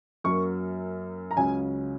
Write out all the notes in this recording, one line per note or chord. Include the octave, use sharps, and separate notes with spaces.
F#2 F#3 A#3 C#6
A#5
C#2 C#3 F#3 C#4 G#5